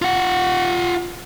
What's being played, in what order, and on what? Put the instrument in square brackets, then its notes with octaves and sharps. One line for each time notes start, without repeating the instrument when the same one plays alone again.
[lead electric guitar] F4 F#5